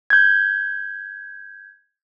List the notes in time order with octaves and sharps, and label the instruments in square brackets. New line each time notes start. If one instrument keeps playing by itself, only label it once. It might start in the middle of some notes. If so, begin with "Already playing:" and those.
[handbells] G6 G#6